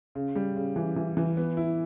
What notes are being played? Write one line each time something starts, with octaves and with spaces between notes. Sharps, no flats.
C#3
G3
C#3
E3
E3
E3
B3
E4